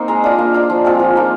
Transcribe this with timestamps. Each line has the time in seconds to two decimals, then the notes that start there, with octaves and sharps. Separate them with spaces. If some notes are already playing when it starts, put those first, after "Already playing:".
Already playing: A#3 C4 D#4 C6
0.08 G#3 A#5
0.24 D4 F4 D#5
0.39 A#3
0.54 D4 F4
0.70 F3
0.84 G#3 C4 F4
0.99 F3
1.16 A#3 D#4